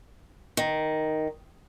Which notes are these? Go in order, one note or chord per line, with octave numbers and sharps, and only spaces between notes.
D#3